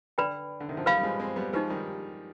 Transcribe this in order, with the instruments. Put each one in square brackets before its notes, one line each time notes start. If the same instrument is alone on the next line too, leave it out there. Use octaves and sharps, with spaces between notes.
[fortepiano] D3 [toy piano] B4 D5 G5 B5
[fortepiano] D3
C3 D#3
D3 F3
[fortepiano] D#3 G3 [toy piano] B4 F5 B5
[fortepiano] G3
F3 G#3
G#3 C4
G3 B3
[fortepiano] F3 G#3 [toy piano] D#4 G4 B4
[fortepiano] D#3 G3